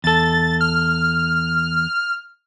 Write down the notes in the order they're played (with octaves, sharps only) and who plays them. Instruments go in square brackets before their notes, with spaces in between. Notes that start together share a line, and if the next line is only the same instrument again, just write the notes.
[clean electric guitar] E2 A4 [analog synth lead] A6
[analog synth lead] F6